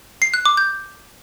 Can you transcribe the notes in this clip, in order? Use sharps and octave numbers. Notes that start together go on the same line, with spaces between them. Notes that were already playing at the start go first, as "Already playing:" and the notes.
C7
F#6
D6
G6